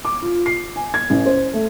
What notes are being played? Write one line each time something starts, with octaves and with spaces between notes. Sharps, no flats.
D6
F4
C7
G#5
G#6
A1
C5
A3